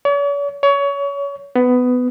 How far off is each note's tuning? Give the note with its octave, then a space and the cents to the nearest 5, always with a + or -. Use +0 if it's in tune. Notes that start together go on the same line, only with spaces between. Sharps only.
C#5 +45
C#5 +25
B3 +15